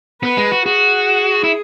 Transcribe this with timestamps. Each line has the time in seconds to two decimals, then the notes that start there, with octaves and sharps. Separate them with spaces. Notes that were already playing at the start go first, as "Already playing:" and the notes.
0.22 B3 B4
0.37 G#3
0.52 F#4
0.66 F#4 G#4
1.44 E4